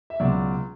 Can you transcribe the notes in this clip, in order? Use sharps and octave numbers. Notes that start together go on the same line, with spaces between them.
E5
C#2 B2 F#3 D5